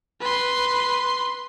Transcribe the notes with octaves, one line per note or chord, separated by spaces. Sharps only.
B4 C6